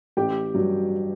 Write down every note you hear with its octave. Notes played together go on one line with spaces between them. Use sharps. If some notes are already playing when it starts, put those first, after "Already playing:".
A1 G4 G5
G2 F#3